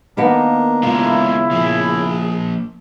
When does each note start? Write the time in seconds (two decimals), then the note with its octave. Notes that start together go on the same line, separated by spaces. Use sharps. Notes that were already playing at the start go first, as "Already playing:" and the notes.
0.17 D#3 A#3 B3 D4 A#4
0.83 C#3 G#3 A#3 E4 F4
1.51 F3 A#3 G#4